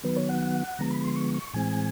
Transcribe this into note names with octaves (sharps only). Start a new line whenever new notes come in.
D#3 F#3 B3 B4
C#5
F#5
D3 F3 G#3 B3 A#5
B5
C6
C#6
C#6
A2 E3 G#3 C4 G#5